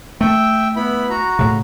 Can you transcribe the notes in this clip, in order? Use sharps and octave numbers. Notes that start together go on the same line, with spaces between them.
A3 E5 G5
B3 E4 B5
F#4 A#5
A2 C#3